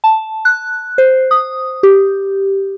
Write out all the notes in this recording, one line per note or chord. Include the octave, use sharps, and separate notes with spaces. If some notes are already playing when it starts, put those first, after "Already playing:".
A5
F#6
C5
D#6
G4